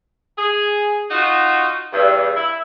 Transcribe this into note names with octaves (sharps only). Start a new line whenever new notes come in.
G#4
D#4 F4 F#4
E2 G2
E4